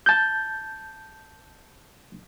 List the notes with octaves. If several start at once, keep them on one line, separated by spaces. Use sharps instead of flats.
A5 G6